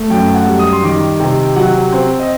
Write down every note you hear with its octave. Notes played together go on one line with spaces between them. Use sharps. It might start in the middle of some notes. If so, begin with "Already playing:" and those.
Already playing: A3
F#2 G5
F#5
G3
D#6
C6
D#3 D6
C3
F#3 F#5
C4
D#5